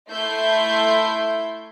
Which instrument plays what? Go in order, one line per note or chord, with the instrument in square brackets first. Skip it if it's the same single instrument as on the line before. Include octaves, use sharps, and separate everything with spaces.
[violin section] A3 E4 E5 C6 G6